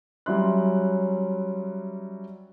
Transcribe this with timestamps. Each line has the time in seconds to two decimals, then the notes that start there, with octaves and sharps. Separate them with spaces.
0.26 F#3 G3 C#4 E5 C6 F#6